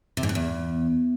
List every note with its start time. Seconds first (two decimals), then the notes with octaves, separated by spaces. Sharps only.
0.17 C3
0.23 G#2
0.29 A2
0.35 E2